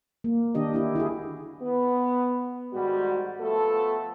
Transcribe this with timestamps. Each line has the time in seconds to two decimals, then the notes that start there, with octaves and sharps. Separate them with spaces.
0.24 A#3
0.55 D#3 D4 G4 D#5
0.73 D4 E4 G4
0.95 E4 F#4 G#4
1.61 B3
2.73 G#2 D#3 G3 F#4
3.40 F3 A3 B3 A4